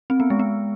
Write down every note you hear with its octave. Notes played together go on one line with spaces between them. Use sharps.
C4
B3
G#3
B3